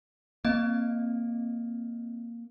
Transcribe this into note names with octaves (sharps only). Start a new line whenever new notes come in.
A#3 C4 D#5